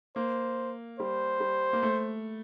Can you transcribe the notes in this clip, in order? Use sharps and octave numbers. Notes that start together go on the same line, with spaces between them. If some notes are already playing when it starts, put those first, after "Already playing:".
A#3 C5
G3 C5
G3
A#3
A3